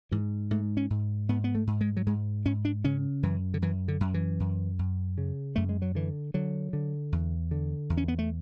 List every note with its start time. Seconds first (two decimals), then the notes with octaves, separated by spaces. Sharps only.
0.11 G#2 E3
0.51 G#2 A3
0.77 C#4
0.90 G#2
1.29 G#2 B3
1.44 B3
1.55 A3
1.67 G#2
1.81 G#3
1.97 F#3
2.07 G#2 G#3
2.45 G#2 C#4
2.65 D4
2.84 C#3 C#4
3.23 F#2 E3
3.54 D3
3.62 F#2 E3
3.88 D3
4.00 F#2
4.14 E3
4.40 F#2
4.79 F#2
5.18 C#3
5.56 F#2 A3
5.69 G#3
5.82 F#3
5.95 D3 E3
6.34 D3 F#3
6.73 D3
7.12 E2
7.51 D3
7.90 E2
7.97 C#4
8.08 B3
8.19 A3